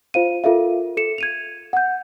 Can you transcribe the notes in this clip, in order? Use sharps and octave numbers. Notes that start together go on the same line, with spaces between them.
F4 C5 F5 D#7
F4 A4 A#4 E5 F5
A4 C#7 E7
G#6 D#7 F7
F#5 G6